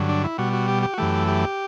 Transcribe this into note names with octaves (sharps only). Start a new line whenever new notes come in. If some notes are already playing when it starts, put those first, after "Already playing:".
Already playing: G2 D3 F#3
D4
E4
B2 G3 F#4
F#4
G4
G4
F#4
F#2 E3 A3 G4
G4